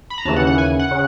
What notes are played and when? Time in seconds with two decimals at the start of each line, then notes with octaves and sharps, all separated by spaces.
0.10 B5
0.18 A#5
0.25 D#2 C#3 E3 A5
0.36 F#5
0.47 F#5
0.58 G#5
0.79 F#5
0.91 C#3